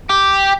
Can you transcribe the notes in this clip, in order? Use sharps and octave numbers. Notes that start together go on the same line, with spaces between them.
G4